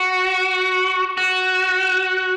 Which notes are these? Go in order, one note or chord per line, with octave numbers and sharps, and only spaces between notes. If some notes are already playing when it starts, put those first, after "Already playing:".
Already playing: F#4
F#4